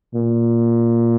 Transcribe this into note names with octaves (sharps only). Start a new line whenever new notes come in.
A#2